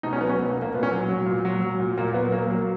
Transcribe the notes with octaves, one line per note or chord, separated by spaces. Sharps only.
B2 D#4
C#4
F#3 B3
C#4
B2 B3
A#3
B2
A#3
A#2 B3
C#4
F#3
F#3
A#2
F#3
F#3
A#2
A#2 A#3
F#3 B3
F#3 A#3
F#3 A#3